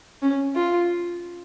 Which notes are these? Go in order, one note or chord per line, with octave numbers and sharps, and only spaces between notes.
C#4
F4